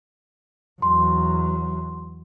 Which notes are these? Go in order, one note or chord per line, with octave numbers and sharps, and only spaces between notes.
E2 F#3 C6